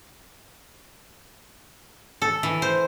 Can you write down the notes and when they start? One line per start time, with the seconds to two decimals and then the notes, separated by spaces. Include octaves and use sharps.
2.22 A4
2.43 E3
2.62 C5